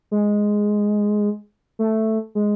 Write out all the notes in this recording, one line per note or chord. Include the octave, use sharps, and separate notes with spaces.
G#3
A3
G#3